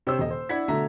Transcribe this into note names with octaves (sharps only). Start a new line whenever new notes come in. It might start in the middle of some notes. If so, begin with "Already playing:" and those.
C3 C5 C#5 E6
D#1 D#5
C5
D4 E4 F#5 G#6 B6
B2 D3 A3 E5 A#5